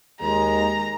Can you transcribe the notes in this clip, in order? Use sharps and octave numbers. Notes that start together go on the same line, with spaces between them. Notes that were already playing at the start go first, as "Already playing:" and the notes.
D#2 G#3 A#5